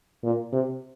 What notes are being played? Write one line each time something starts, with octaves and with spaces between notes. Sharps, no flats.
A#2
C3